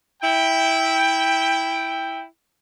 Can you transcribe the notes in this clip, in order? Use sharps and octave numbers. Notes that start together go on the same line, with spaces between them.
E4 G5